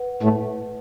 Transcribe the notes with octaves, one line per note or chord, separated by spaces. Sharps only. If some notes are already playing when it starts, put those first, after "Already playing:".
Already playing: B4 F#5
A2 A3